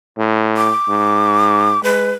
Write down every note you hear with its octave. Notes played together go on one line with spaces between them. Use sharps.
A2
D6
G#2
G#3 B4